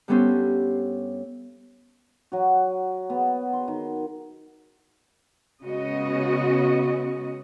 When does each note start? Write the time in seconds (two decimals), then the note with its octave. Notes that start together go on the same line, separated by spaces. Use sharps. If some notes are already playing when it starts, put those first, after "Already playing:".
0.08 G2 G3 B3 C#4 A4 C5
2.32 F#3 F#4
3.10 B3
3.53 C6
3.68 D#3
5.63 C#3 G#3 B3 C#4 F#4 D#5